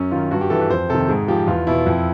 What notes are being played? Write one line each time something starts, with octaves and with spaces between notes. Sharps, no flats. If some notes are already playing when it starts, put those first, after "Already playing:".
Already playing: F#2 C#4
D#3 F4
G2 F#4
G4
E3 A4
B4
F2 C5
C3 D#3 A4
G#2 G#4
F3 G4
E2 F4
B2 E4
F2